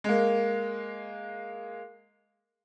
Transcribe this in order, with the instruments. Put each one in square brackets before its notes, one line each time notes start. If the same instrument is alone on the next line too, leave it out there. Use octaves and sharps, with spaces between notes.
[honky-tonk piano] G#3 A#3